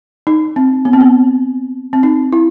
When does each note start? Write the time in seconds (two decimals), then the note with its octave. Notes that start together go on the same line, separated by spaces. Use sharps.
0.27 D#4
0.56 C4
0.85 B3
0.93 C4
1.01 B3
1.93 C4
2.03 D#4
2.33 E4